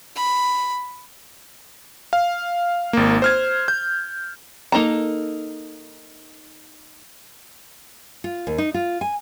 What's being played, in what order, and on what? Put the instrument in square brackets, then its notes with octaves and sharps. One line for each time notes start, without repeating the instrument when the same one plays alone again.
[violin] B5
[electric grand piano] F5
G#1 A#3
C5 F6 G#6
G6
[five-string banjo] A#3 D#4 A4 A#5
[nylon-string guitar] F4
D#2
D#4
F4
G#5